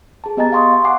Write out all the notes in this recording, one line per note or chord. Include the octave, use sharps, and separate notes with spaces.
G#4 A5
B3 G4 D#5 G#5 A#5 A6
F5 G#5 C6 C#6 D#6
F5
F#5 G#5 D6 C7